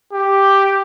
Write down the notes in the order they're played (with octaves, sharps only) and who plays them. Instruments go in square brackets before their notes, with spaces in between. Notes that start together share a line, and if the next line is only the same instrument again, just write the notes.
[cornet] G4